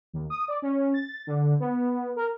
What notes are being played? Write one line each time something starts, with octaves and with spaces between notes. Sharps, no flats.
D#2
D#6
D5
C#4
A6
D3
B3
A#4